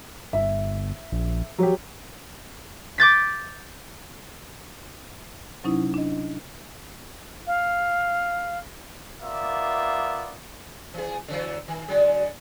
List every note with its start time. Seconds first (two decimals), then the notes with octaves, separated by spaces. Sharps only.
0.33 G1 E5
1.12 A#1
1.59 F3 F#3 G4
2.98 D6 G6 A6 B6
5.64 C3 F#3 C#4 D#4 E4
5.94 D4 D#5
7.47 F5
9.21 A#3 B3 F4 D5 E5
10.94 E3 G#4
11.28 D3 E3 F#3
11.68 D#3
11.88 D3 F#3 G#3